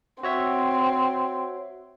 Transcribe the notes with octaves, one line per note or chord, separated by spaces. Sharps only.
C4 F#4 C#5 E5